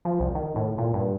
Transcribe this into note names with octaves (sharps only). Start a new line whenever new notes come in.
F3
C2
D#3
A2
A#2
G2